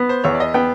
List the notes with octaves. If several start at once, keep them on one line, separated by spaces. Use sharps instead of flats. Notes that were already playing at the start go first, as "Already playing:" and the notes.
Already playing: B3
C5
E2 C#5
D5
D#5
B3 G5